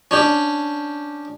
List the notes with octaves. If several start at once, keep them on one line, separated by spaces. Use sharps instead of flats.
C#4 D4 G4